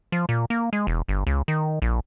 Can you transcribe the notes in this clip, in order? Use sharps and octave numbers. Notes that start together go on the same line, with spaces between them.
F3
A#2
A#3
G#3
E1
G1
C#2
D#3
A#1